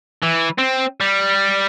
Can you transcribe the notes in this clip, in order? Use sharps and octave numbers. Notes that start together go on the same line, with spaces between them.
E3
C4
G3